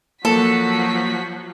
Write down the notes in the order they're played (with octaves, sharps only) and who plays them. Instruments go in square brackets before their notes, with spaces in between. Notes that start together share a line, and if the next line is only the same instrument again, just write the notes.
[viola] F3 F#3 [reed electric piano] A#3 [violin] F#4 B6 [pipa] A4